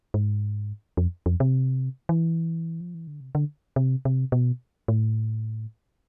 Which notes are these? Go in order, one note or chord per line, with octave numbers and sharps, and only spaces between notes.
G#2
F2
F2
C3
E3
F3
E3
D3
C3
D3
C3
C3
B2
A2